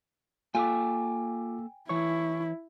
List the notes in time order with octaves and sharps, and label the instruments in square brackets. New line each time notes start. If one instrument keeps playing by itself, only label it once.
[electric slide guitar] A#3 A4 [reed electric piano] F4 D6 [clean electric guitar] G5 G#5
[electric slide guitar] E3 C#5 [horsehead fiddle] E4 [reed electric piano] C#6